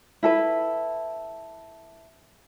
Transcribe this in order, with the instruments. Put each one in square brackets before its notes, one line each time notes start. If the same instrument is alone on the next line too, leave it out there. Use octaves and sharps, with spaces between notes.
[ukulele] E4 A4 B4